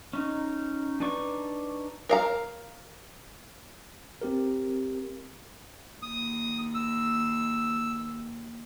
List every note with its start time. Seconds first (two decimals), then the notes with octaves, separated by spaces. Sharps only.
0.13 C#4 D#4
1.00 D4 D#4 B4 D5 C#6
2.09 A#4 F5 A#5
4.22 C4 G4 A#4
6.02 D#2 D#6
6.75 E6